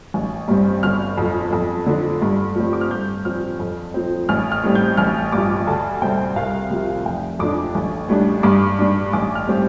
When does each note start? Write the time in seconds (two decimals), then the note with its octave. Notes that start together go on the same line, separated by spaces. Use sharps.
0.14 A1
0.48 G2 G3 C4
0.83 G1 F6
1.18 F2 F3
1.53 F2
1.86 D3 F3 D4
2.22 G2
2.56 F3 A3 C4
2.73 D6
2.81 F6
2.90 G2 G6
3.25 F3 C4 F6
3.59 F2
3.94 F3 C4
4.29 A1 F6
4.52 F6
4.63 A2 G3 C4
4.75 G6
4.97 A1 F6
5.32 G2 F3 D6
5.67 D2 A5
6.02 C3 G3 C4 G5
6.36 C2 F5
6.71 C3 F3
7.05 F1 G5
7.39 F2 F3 D4 D6
7.75 A1
8.09 A2 G3 D4
8.43 G2 D6
8.79 G3 D4
9.13 A1 D6
9.35 F6
9.47 A2 G3 C4